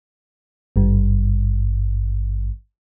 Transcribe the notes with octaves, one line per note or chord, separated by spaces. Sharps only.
G#1 G2